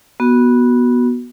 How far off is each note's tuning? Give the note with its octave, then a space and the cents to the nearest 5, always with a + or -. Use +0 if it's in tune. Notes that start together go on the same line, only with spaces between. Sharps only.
B3 -15 F#4 +0